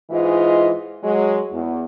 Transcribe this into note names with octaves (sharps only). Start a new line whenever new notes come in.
G#2 E3 G#3 F4 D#5
F#3 G#3
E2